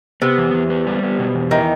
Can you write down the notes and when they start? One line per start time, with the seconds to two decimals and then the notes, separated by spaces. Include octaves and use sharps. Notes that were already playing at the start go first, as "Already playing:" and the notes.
0.22 C3 B3
0.38 E2
0.54 E2
0.70 B3
0.87 G3
1.03 B3
1.19 B2
1.35 E2
1.51 D#3 E4